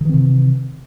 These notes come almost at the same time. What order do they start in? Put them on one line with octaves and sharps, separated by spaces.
D#3 E3 C4 C3